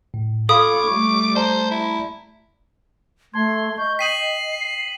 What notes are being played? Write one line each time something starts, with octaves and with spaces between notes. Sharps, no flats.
A2
F4 A4 C#5 F5 B5 D6 D#6
G3 A3 C#6
C5 D5 A5 A#5
E4
A3 A5 C6 G#6
D#5 C#6 G6
G5 D#6 B6 C7 D#7 F#7